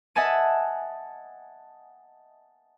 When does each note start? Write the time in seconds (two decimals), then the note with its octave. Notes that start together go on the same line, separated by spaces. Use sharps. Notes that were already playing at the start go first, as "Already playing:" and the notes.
0.15 D#5 E5 F#5 G#5 A5 D#7